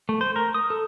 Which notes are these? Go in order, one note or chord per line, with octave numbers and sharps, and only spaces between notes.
A3
C5
A#4
D#6
A4